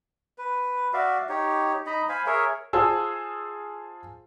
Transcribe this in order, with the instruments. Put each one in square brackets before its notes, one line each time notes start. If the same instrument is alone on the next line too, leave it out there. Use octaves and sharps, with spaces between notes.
[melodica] B4
F#4 D5 E5 F5
D#4 G4 C#5
D#4 D#5 A#5 B5
C5 F5 G#5 B5
G#4 A#4 C#5 E5
[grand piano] F4 G#4 C5 A5 E6